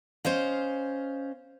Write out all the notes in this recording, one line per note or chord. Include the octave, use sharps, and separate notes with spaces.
C#4 C5 D#5 F5